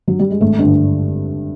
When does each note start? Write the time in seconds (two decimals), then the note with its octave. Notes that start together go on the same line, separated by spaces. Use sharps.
0.08 F#3
0.19 G3
0.30 G#3
0.41 G#1 A3
0.59 G2 D3